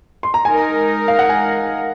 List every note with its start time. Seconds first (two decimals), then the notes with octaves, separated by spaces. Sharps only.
0.23 C6
0.34 A#5
0.45 G#3 D#4 A#4 G#5
1.08 F5
1.19 F#5
1.29 G#5